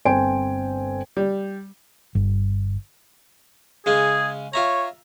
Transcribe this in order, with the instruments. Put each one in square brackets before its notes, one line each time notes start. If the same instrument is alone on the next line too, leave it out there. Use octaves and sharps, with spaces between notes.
[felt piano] G1 C4 C5 G5 G#5 D7
[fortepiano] G3
[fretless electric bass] G1
[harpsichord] C#3 G#3 C#4 [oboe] G#4
[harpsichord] F4 E5 A#5 [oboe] C#5